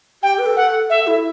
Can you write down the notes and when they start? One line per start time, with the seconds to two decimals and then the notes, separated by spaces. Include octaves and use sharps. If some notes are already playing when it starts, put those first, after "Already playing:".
0.23 G4 G5
0.39 B4
0.46 A4
0.57 F#5
0.90 A4 E5
1.07 E4